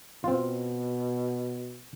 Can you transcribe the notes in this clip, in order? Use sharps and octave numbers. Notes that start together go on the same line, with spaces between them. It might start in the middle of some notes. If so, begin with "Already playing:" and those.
B2 C4 F4